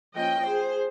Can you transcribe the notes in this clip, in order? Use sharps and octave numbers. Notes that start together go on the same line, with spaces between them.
F3 A#3 C#4 D#5 G5
G#4 C5